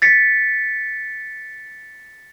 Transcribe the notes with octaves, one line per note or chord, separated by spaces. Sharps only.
A6 B6 C#7